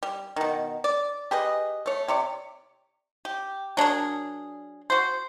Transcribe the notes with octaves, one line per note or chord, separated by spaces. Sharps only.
G3
B2 D#3
D5
G4 G#4 B4 D#5
A3 C#5
C3 C#5 D5
G4
F#3 D4 G#4 A#4
F#4 C5